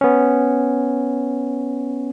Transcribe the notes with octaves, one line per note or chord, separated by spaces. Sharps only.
B3 C#4